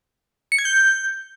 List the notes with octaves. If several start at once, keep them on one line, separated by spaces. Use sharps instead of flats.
C#7
G#6
G6